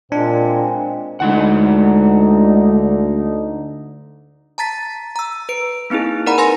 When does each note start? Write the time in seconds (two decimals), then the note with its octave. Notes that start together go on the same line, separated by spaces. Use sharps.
0.12 A#2 G#3 C4 D4
1.20 D2 D3 G#3 D#4 E4 F#5
4.58 A5 A#5 A6 B6
5.16 A#5 E6
5.49 B4 D7
5.90 A#3 C4 D#4 E4 G#4
6.26 D#4 A#4 D5 F#5 A#5 B5
6.38 B4 G#5 C6 A#6